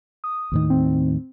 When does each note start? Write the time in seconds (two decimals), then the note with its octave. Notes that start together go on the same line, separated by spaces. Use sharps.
0.24 D#6
0.52 D#2 A2 D#3
0.70 C4